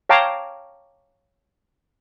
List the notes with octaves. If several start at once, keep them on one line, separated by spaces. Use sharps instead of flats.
C#5 F5 G5 A5 A#5 D6